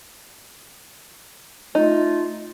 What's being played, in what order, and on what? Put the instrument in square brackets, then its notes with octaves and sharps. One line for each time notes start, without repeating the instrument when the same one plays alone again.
[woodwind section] A3 F4 [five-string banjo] D#4